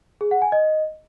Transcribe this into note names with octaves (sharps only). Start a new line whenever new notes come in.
G#4
F#5
G#5
D#5